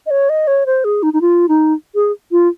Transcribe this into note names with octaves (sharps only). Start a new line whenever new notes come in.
D#5
C#5
D#5
C#5
C5
G#4
D#4
D#4
F4
D#4
G#4
F4